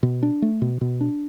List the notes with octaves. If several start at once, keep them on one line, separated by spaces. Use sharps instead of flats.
B2
D4
A3
B2
B2
D4